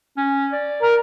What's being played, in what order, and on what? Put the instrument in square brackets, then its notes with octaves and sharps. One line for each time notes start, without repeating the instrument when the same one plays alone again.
[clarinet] C#4
D5
[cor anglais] A#4